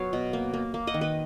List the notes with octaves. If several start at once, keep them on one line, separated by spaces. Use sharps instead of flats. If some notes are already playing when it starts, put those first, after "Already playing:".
Already playing: F#3 B3 C#5 F5
B2
A#3
A#3
A#3
D#5 F#5
D#3
B4 D#5